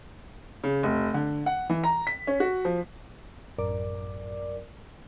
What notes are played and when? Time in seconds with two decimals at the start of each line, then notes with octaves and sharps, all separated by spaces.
0.64 C#3
0.83 F1
1.14 D3
1.46 F#5
1.70 E3
1.84 A#5
2.07 B6
2.27 C#4
2.40 F#4
2.65 F3
3.58 A1 F#2 A#4 D5 D6